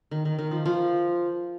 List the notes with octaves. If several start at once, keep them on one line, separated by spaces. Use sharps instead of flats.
D#3
D#3
D#3
F3
F3